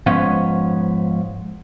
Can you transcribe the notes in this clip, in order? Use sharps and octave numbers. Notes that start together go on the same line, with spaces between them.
G#2 F3 B3 C#4 B4 C#5